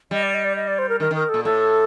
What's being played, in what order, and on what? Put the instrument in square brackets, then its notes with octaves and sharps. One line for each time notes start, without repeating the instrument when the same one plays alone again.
[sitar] G3 [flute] D#5
[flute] D5
D#5
D5
D#5
D5
C5
A#4
[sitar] D#3 [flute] A#4
[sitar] D#3 [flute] A#4
[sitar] A#2 [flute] A4
[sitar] A2 [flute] A4